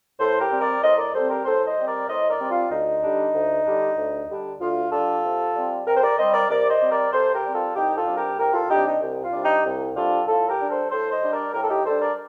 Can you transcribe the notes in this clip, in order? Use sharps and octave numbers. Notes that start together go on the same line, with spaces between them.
A2 A4 C5
G4 A#4
G3 C4
A#4 D5
A2 C5 D#5
A#4 D5
G3 C4 A4 C5
G4 A#4
A2 A4 C5
C5 D#5
G3 C4
A#4 D5
A2 C5 D#5
A#4 D5
G3 C4
F4
D2 D#4
D3 G3 D4
D2
D3 G3 D4
D2
D3 G3 D4
D2 F4
D3 G3 D4 F4 A4
C3
G3 C4
C3 G4 A#4
C5
A#4 D5
G3 C4 C5 D#5
A#4 D5
C3 A#4 D5
C5 D#5
G3 C4
A#4 D5
C3 A4 C5
G4 A#4
G3 C4
F4 A4
C2 D#4 G4
F4 A4
C3 G3 D4
G4 A#4
C2 G4 A#4
F4 A4
C3 G3 D4 D#4 G4
D#4
C2
F4
C3 G3 D4
D#4 G4
C2
C3 G3 D4 F4 A4
A2 F4 A4
G4 A#4
G3 D4
A4 C5
A2 A4 C5
C5 D#5
G3 D4
A#4 D5
A2 G4 A#4
A4
D#4 G4
G3 D4 A4 C5
A#4 D5